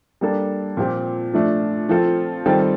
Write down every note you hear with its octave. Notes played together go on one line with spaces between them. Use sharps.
G3 A#3 D4 A4
A#2 F3 C4 G4
F3 A3 D4
F3 C4 F4 A4
D#3 G3 C4 F4 A4